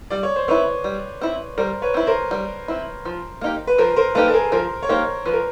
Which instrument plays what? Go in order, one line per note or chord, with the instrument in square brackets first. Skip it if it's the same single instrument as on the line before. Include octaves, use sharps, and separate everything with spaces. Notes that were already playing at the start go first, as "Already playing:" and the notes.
[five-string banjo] G3 [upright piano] D5
[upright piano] C#5
C5
[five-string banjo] C4 E4 [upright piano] B4 C#5
[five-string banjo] G3
C4 E4
[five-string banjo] G3 [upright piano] A#4 C5
[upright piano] B4 C#5
[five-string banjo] C4 E4
[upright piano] A#4 C5
[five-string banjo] G3
C4 E4
F3
A#3 D#4 G4
[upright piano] B4
[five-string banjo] F3 [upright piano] A#4 C5
[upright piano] A#4 C5
[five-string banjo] A#3 D#4 G4 [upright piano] A4 B4
[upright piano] A4
G#4 A#4
[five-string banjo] F3 [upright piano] A#4 C5
[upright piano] C#5
[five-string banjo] A#3 D#4 G4 [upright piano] A#4 C5
[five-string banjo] F3 [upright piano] B4
[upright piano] A#4